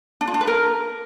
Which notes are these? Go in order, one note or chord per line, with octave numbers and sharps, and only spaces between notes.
D4
F4
D4
B4
A#4